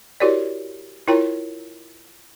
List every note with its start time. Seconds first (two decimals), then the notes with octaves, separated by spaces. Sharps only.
0.20 E4 F#4 G4 A#4 C#5 D5
1.08 E4 F4 A#4 C#5 G5 A#5